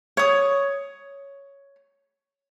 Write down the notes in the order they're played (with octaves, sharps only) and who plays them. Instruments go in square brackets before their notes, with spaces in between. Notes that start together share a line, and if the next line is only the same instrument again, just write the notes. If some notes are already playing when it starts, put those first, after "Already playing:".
[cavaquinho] C#5 D#6